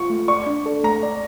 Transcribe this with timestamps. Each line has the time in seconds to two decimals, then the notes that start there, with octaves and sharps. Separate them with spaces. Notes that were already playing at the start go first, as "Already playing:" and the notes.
Already playing: F4 C#6
0.10 A3
0.28 D5 C#6
0.46 D4
0.66 A4
0.84 A3 A#5
1.03 D5